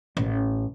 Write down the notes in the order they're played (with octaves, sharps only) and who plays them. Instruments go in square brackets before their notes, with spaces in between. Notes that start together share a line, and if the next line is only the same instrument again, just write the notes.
[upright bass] A1